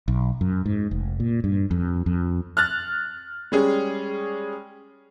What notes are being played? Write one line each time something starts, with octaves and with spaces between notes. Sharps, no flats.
B1
F#2
G#2
F1
A#2
G2
F2
F2
F6 F#6 A6
G3 G#3 C#4 G#4